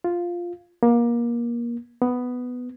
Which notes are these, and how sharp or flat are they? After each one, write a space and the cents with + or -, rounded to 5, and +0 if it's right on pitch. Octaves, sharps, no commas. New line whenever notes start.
F4 +0
A#3 +25
B3 +5